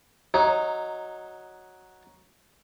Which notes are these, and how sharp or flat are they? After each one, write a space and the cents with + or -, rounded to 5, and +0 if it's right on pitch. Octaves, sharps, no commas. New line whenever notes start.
F#3 +0 D#4 +0